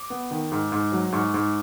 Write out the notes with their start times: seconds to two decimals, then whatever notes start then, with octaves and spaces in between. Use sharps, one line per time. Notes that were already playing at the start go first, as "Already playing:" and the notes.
Already playing: D6
0.10 B3
0.31 D#3
0.52 G#2
0.72 G#2
0.92 F#3
1.12 G#2 C#6
1.34 G#2